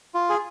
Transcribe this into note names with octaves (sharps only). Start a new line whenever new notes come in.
F4
G#4